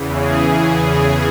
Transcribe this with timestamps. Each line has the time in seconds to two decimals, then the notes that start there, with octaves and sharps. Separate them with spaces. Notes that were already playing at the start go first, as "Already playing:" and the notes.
Already playing: E2 C#3 E3
0.17 G#4